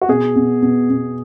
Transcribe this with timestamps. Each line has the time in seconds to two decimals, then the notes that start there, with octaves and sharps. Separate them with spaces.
0.02 F#4
0.09 B2 G#4
0.36 B2
0.62 B2
0.90 B2